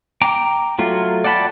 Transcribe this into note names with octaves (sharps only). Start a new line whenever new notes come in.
G5 A#5 D6
F#3 A3 F4
D5 F#5 G5 A5 B5